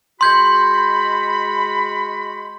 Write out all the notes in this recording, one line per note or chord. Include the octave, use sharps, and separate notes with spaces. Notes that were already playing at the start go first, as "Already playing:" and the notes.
G#3 F#4 B5 C6 G6 G#6